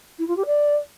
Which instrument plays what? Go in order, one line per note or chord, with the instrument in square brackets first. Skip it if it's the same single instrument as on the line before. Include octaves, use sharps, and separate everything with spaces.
[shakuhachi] E4
F4
G4
D5